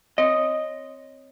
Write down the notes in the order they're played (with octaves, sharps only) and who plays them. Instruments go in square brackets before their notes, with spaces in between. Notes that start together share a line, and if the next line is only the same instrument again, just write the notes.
[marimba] C4 C#5 [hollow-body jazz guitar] D#5